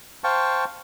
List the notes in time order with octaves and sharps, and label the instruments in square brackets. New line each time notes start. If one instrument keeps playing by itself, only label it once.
[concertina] C5 F5 G5 A5 C#6